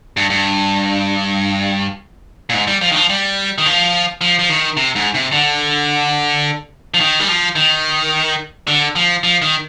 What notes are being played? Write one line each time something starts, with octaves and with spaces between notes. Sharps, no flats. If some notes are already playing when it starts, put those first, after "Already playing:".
G2
G2
A#2
G#2
G3
F3
D#3
F3
G3
D#3
F3
F3
F3
D#3
C3
G#2
C3
D3
F3
D#3
G3
F3
D#3
D3
F3
F3
D#3